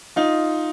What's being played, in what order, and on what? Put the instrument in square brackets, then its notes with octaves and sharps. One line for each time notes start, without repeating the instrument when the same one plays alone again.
[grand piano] D#4 F4